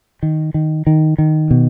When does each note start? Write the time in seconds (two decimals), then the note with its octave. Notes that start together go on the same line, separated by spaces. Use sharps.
0.23 D#3
0.54 D#3
0.87 D#3
1.18 D#3
1.51 B2